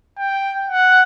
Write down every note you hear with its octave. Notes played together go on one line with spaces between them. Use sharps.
G5
F#5